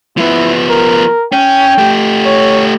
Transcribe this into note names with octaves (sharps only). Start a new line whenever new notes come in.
F3 B3 E4
A#4
C#4 G5
A3 G4
C#5